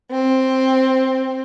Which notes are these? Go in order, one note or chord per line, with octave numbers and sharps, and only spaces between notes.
C4